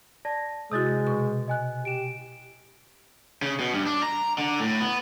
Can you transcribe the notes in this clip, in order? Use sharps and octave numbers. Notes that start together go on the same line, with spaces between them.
D5 A5 A#6
C3 G#3 E4 F#4 D#6 G6 A6
B2 C#6
D#5 G#5 F#6
G4 D7 E7
C#3
B2
G2
D4
A#5
D3
A2
B3